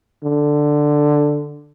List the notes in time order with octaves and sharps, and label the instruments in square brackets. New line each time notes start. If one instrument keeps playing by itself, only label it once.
[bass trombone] D3